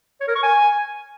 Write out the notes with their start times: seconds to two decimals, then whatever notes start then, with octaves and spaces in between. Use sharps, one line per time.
0.21 C#5
0.28 A#4
0.36 C#6
0.43 G#5